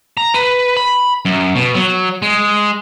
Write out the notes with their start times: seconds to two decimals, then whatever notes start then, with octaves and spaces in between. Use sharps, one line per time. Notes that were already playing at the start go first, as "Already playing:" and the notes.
0.17 A#5
0.34 B4
0.77 B5
1.25 F#2
1.55 B2
1.75 F#3
2.22 G#3